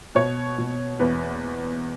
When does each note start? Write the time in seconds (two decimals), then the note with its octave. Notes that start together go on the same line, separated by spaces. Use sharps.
0.15 B2 C#5
0.58 B2
0.99 E2 B4